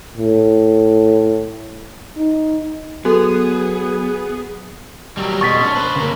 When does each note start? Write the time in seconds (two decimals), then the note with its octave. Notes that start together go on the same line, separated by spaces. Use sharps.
0.16 A2
2.17 D#4
3.05 F#3 B3 F#4 G#4 A4
5.17 F#3 G3
5.41 B2 G#3 C#6 A6 B6
5.61 C#4 D4
5.75 B4 C5
5.96 C#3 A#3